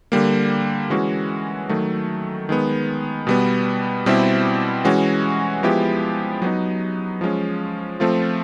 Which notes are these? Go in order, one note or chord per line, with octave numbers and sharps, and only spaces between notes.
D3 G3 A#3
E3 G#3 C#4 F#4
D#3 F#3 A3
D#3 G#3 B3
B2 G3 B3
B2 G3 C4 E4 G4
E3 G#3 C#4 F#4
F3 G#3 B3 E4 G4
F#3 B3 D#4
F3 G#3 C#4
F3 A3 C4 F4